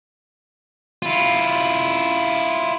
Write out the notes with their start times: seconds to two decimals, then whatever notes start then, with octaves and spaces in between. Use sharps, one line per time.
1.02 E4 F4